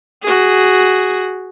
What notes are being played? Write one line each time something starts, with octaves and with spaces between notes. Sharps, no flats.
F#4 G#4